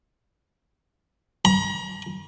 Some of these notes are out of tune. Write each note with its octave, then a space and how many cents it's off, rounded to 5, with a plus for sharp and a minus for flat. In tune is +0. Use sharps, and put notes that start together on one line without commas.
A#5 +40